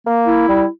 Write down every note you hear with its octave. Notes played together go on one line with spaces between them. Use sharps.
A#3
E4
G3